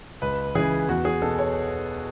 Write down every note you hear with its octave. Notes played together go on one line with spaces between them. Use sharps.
C#2 B4
C#3 E3 G#4
E2 F#4
G#4
B2 A4
C#5